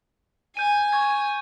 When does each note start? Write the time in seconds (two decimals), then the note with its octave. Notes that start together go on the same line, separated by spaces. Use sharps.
0.57 G#5 G6 D#7
0.93 C#6 G#6